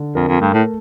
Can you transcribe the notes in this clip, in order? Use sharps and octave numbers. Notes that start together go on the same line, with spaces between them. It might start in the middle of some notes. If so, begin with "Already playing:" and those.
Already playing: D3
F2 A#4
F2
G2 A3
A2